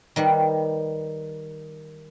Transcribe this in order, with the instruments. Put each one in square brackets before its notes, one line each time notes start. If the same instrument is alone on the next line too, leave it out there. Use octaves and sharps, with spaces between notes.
[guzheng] D#3 G3 B4